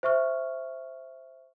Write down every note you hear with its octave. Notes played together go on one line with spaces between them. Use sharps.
C5 E5 C#6 F6